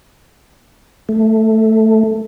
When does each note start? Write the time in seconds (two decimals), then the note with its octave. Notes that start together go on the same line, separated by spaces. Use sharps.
1.09 A3